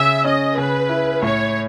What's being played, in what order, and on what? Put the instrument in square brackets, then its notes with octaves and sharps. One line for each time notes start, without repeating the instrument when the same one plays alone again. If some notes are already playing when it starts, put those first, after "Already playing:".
Already playing: [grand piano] C#3 [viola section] E5
[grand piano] C#4 [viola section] D#5
[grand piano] C#3 [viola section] B4
[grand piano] E4
[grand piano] A2 [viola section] C#5